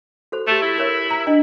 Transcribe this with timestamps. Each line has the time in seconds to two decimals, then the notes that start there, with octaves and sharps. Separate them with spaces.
0.32 F#4 A4 C5
0.47 A3 G4 A6
0.62 E4
0.78 A#4 C#5 E5
1.10 A#5 B6
1.27 D4 D#5